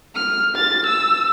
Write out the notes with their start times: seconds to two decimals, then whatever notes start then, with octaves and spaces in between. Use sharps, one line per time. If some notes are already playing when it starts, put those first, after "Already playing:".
0.15 F6
0.56 A6
0.86 E6